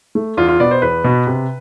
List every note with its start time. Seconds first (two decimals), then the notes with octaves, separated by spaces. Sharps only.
0.15 A3
0.37 E2 F4
0.48 F4
0.60 B2 B3 D5
0.71 C5
0.82 E2 B4
1.04 B2 B3
1.27 C3